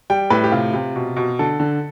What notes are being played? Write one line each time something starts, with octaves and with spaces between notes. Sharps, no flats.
G3 G5
A2 B4
G4
C3 F4
C3
B2
B2
D3 A4
D3